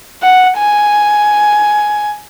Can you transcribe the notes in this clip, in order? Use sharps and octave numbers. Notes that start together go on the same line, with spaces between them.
F#5
G#5